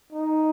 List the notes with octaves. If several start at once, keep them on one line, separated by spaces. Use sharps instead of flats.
D#4